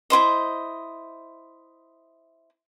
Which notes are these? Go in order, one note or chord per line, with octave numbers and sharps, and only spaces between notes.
E4 F4 C5 D#5